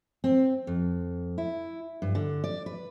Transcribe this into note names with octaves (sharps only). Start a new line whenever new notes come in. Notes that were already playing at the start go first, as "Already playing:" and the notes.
C4
F2
E4
G2
D3
D5
B4